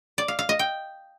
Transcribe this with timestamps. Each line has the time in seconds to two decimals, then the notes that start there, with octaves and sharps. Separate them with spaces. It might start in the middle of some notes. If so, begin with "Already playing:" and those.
0.18 D5
0.28 F5
0.39 F5
0.49 D#5
0.59 G5